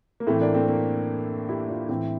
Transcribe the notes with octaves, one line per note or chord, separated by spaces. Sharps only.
A#3
A2 E3 A3 C4
A#3 D4
A3 C4
A#3
E4 G4
D4 F4
A2 E3 C4 E4